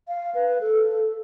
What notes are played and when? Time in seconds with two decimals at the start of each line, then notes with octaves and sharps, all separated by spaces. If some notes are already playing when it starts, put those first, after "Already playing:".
0.08 F5
0.35 B4
0.61 A4